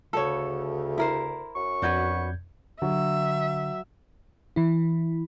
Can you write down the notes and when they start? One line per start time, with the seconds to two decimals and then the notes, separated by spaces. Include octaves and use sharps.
0.13 D2 C#3 A4 C#5
0.98 E4 A#4 C5
1.55 F#2 C#6
1.82 F2 D4 F#4 B4 G6 G#6
2.82 D3 F#3 E5
4.56 E3 E4